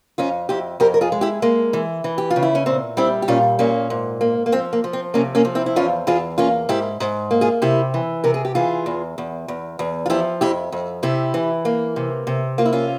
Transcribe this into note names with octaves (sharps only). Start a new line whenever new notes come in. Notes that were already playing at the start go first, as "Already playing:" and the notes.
F2 C#4 F4
F2 E4 G4
F2 G4 A#4
A#4
F4 G#4
G#3
E4 G4
G#3 A#3
E3
E3
G4
F4
C#3
E4
C#4
A#2 C4
G3 C4 E4
G4
A#2 C#4 F4
A#2 A#3 C#4
G#2
A#3
A#3
F3 C4
A#3
F3
C4
C3 A#3 C#4
A#3 C#4
F3
C4 E4
E4
E2 C#4 F4
E2 F4 G#4
A#3 C#4 F4
G#2 E4 G4
G#2
A#3
F4 G#4
C3 E4 G4
E3
C3 A#4
G#4
G4
E3 F4 G#4
E2
E2
E2
E2
F4
F3 E4 G4
F2 E4 G4
F2
C3 E4 G4
E3
A#3
C3
C3
A#3 F4
E4
C#4 F4